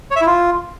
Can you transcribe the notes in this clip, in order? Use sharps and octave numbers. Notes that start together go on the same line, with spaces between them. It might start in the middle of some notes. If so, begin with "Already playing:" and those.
C#5
E5
E4
F4